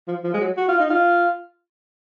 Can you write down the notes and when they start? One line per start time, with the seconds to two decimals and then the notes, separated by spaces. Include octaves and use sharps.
0.08 F3
0.24 F3
0.34 G#3
0.40 F#3
0.57 F#4
0.68 F4
0.80 D#4
0.90 F4